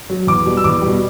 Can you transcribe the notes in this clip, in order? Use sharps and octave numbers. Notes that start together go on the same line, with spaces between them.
F#3
E2 D6
B2 G3
E6
E2 D6
B2 G3